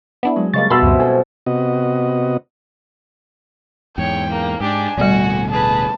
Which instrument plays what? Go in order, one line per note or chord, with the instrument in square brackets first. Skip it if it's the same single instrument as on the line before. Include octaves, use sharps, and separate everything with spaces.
[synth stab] B3 D4 E4
[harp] F#3 G#3
[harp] G2 C#6 [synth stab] C#3 G#3 A#3 [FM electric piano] A6
[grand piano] B2 E6 [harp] E5 [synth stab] B5 C6
[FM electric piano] C#2 F#2 [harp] C4 C#4
[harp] E4 A4 C5 [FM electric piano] G#5
[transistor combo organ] C3 B3 F#4 D#5
[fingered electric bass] E2 G#2 [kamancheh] C#5 [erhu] G5
[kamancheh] A#3
[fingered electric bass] G#2 [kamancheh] D4 G4 [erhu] G#5
[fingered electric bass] D1 B2 A3 [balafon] G3 D5 [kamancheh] F#4
[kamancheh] G#4 B4 [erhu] A5